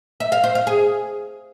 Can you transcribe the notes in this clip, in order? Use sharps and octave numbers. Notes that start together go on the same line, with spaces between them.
E5
F5
C5
F5
G#4